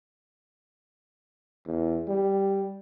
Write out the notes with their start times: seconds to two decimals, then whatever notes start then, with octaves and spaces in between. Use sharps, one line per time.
1.66 E2
2.08 G3